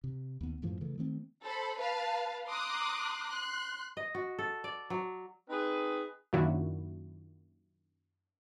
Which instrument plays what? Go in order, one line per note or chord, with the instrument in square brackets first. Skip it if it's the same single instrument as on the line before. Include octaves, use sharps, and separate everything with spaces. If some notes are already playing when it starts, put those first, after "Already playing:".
[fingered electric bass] C3
D#2 B3
F#2 A2 E3 F3
C#3 E3 A3
D#3 A3 B3 C4
[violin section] A4 C5 B5
B4 F5 A5
A#5 C6 D6 D#6 F#6
C6 F#6
[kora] D#5
F#4
A4
D5
F#3
[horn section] C4 D#4 G#4 B4
[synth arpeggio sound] F#2 A#2 D#3 D4 E4 F#4